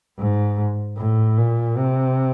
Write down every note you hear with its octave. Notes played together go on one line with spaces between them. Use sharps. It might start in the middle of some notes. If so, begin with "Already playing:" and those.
G#2
A2
A#2
C3